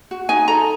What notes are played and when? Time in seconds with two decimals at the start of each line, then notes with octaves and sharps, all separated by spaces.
0.11 F#4
0.29 D#4 G#5
0.48 A4 A#5